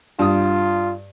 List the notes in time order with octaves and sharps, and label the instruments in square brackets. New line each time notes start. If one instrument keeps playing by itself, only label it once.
[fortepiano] G2 D#6 [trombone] F4